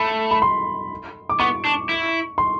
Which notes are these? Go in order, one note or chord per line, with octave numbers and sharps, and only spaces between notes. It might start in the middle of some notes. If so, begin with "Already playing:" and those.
Already playing: A3 B5
B5
C6
D6
B3 C#6
D4
E4
C6